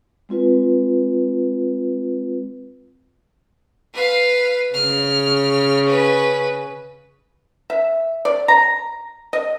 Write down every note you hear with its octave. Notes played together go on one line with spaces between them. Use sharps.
G#3 C4 F4 B4
B4 F5
C#3 F6
C#4 B4
E5
D5
A#5
D#5